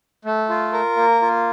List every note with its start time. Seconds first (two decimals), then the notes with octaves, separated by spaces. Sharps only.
0.25 A3
0.49 F4
0.73 A#4
0.97 A#3
1.22 F4